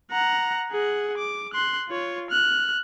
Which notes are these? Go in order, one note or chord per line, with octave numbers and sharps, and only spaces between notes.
F#5 A#5
G#4 F#5
D6
C6 F#6
F4 C#5
F6 F#6